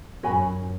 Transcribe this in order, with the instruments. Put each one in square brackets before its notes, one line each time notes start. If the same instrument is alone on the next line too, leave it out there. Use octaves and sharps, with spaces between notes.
[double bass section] F#2 [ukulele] F#4 C#5 G#5 B5